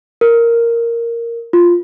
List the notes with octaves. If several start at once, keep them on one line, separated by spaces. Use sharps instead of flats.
A#4
F4